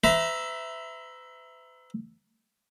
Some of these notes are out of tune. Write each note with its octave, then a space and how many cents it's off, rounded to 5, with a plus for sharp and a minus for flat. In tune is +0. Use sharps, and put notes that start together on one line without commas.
B4 +45 E5 +0 A#5 +20